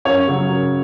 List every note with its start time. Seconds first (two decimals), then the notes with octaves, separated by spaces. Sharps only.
0.05 F#2 C#5
0.28 C#3 F#3
0.51 F#2